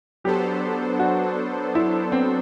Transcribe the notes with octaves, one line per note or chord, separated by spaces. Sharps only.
F#3 B3 D4 G4 A4 C5
F#4
E4
C4